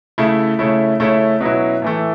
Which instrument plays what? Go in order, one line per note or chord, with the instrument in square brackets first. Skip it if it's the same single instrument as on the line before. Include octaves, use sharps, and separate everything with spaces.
[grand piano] C#3 A3 E4
C#3 A3 C#4 E4
C#3 A3 C#4 E4
B2 F#3 C#4 E4
A2 E3 A3